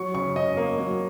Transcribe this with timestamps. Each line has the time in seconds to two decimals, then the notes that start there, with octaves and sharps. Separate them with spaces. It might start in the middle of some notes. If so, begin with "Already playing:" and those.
Already playing: F#3 C#6
0.15 C#3 C#6
0.36 C#3 D#5
0.57 A#3
0.78 F#3